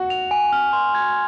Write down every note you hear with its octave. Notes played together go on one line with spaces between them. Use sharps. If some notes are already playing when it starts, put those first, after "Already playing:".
Already playing: F#4
F7
G#5
F6
C6
G#6